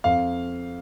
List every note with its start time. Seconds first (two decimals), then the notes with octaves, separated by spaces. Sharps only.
0.04 F2 F5